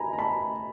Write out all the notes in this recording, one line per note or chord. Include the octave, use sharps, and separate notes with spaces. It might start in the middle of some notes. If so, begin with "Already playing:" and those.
Already playing: G#5 A#5 B5
A#5
A5 B5